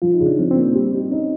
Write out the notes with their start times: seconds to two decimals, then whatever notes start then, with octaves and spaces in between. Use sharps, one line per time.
0.02 F3 F4
0.14 D#4
0.20 C#3
0.26 D4
0.39 F3 C4
0.51 C4
0.57 A#3
0.63 C4
0.75 G3
0.94 D#4
1.12 C#4 D#4